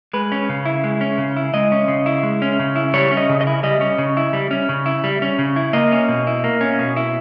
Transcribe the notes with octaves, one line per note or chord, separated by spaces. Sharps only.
G#3 B4
C#4
C#3
E4
G#3
C#4
C#3
E4
G#3 D#5
C#4
C#3
E4
G#3
C#4
C#3
E4
G3 C#5
C#4
D#5
C#3
D#5
E4
G3 D#5
C#4
C#3
E4
G3
C#4
C#3
E4
G3
C#4
C#3
E4
A#3 D#5
C#4
B2
E4
A#3
C#4
B2
E4